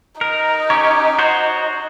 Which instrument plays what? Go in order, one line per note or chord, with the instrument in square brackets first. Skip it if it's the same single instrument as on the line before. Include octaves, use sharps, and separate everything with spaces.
[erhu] D#4 [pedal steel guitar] A#4
[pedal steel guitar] C#4 G4 C#5
F#4 C5 C#5